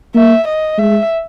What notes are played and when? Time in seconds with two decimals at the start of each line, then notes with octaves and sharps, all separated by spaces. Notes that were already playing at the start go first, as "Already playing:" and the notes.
0.15 A#3 E5
0.47 D#5
0.78 G#3 E5